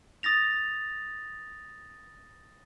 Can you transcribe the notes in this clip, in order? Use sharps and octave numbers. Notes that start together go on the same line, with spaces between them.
D#6 A6 A#6 F7